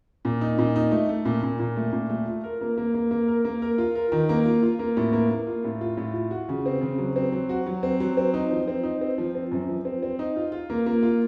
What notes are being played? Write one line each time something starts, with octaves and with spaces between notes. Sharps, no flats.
A#2
D#4
A#2
D#4
A3
A3
A#2
A#2
A#2
A3
A#2
A3
F4
A#4
A#3
A#3
A#3
A#3
A#4
A#3
A#4
F4
A#4
D#3
A#3
F4
F4
A#3
A2
A#3
A#3
F4
A2
F4
A2
F4
F#4
C#3
C4
C#3
F#3
C4
F#3
F#4
F#3
C4
F#3
C4
D#4
F3
C4
D#4
C4
F3
C4
F#2
F3
C4
C4
D#4
F4
F4
A#3
A#3
F4